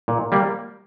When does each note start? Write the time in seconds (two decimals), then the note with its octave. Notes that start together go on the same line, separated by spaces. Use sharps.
0.08 A#2
0.32 G3 A#3